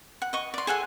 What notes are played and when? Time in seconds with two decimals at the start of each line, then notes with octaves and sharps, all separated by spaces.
0.22 F#5
0.33 D#5 C#6
0.54 D5 C6
0.67 G#4 A4 F#5 G#5